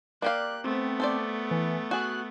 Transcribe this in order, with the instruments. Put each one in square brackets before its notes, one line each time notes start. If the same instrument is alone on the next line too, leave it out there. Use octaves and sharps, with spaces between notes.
[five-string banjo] A#3 G4 F5 [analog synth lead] D5 [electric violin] F#6
[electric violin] A3 B3 [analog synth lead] C4
[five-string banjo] A4 C5 D5
[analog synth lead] E3
[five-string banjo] F#4 G#4 [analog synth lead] F#6